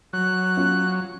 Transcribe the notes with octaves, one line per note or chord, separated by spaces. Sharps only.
F#3 F#6
C#4 F4